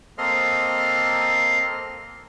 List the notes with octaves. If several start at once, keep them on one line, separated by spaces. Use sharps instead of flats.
A#3 C4 A4 D#5 C6 F6